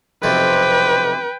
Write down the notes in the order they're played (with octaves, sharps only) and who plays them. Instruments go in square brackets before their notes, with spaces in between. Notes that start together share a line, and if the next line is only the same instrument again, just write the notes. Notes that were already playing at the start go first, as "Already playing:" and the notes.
[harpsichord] B1 F2 C3 [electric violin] B4 G5